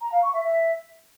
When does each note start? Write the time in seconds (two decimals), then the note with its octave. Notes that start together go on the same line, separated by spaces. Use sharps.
0.01 A#5
0.12 F5
0.23 C#6
0.34 E5
0.44 E5